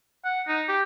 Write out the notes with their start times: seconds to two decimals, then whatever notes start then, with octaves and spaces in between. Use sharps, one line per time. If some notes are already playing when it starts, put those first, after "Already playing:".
0.25 F#5
0.48 D#4
0.69 G4